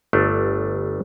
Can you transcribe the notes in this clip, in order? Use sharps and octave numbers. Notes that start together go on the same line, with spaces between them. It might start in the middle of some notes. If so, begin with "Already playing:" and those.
G1 A3 D4